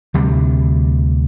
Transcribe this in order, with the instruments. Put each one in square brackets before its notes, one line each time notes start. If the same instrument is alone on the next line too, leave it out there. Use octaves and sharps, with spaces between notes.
[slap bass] D2 C3 G3